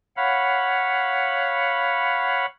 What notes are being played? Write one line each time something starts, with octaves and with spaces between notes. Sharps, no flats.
C#5 F5 F#5 B5